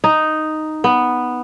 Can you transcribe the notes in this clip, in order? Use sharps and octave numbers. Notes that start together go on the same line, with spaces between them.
D#4
B3